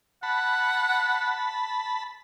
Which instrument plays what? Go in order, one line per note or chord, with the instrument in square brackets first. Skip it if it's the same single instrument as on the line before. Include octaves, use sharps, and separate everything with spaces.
[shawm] F#5 [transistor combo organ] A5 B5